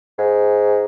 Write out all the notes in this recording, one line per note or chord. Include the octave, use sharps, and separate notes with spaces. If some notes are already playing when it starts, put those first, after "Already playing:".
G#2